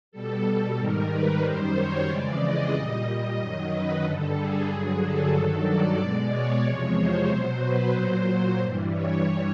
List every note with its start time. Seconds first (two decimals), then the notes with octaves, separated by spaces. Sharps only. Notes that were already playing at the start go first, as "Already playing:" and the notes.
0.12 B2 G3 A4
0.77 G#2 D#3 G3 A#4
1.09 B4
1.41 F#2 D#3 G3 C5
1.74 C#5
2.07 F2 C#3 E3 G#3 D5
2.40 D#5
2.72 A#2 G3
3.05 D#5
3.37 F#2 D#3 F#3
3.70 B4
4.02 G2 D3 G3 A4
4.35 G#4
4.68 G2 D3 F#3
5.00 A4
5.33 G2 D#3 F#3
5.65 D5
5.98 B2 G#3
6.31 C#5
6.63 E2 C3 F3 G#3
6.96 C5
7.28 B2 F#3
7.61 B4
7.93 A#2 F#3 C5
8.59 G2 E3 G3
8.91 C#5